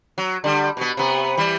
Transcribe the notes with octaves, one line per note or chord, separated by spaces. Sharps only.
F#3
D3 G3
B2 B3
C3 B3
E3 G3